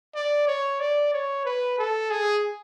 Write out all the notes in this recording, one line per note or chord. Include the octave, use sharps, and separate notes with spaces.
D5
C#5
D5
C#5
B4
A4
G#4